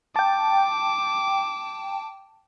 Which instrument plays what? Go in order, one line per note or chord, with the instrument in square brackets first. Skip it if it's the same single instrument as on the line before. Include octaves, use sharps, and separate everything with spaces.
[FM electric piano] G5 A5 [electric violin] D6